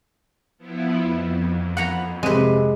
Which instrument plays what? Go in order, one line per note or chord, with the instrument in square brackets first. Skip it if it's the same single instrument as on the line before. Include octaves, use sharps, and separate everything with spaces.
[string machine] F3 B3 E4
F2
[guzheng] F#5 A#5 B5
[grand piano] C3 [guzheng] G#3 B4